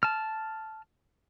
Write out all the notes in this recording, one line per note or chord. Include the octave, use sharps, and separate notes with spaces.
A5 F6